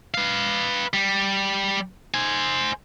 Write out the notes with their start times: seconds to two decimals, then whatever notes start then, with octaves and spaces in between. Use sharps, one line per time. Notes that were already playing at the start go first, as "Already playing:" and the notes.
0.14 B4 F5
0.93 G3
2.14 C5 G#5